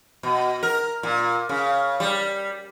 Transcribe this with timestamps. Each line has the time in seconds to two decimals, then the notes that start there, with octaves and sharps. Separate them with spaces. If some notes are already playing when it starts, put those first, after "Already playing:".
0.23 B2
0.63 A#4
1.03 A#2
1.49 C#3
2.00 G3